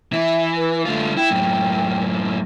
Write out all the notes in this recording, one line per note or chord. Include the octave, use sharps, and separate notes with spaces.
E3 E5
B4
D3 A3 F4
E4 G5
F#2 A2